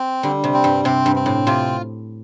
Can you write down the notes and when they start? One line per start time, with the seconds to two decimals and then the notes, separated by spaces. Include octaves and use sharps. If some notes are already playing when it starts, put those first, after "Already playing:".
Already playing: C4
0.23 D3 G3
0.44 C3
0.54 C4
0.64 G2
0.85 C3 C4
1.06 G2
1.16 C4
1.26 A2
1.47 C3 F4